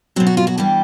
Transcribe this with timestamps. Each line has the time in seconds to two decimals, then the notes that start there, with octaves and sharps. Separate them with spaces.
0.16 B2 F#3 C4
0.27 F#4
0.37 F4
0.47 F#4
0.58 G2 E3 G3 G4